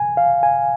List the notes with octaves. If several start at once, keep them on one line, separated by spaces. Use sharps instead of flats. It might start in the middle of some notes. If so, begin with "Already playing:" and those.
Already playing: G#5
F5
G#5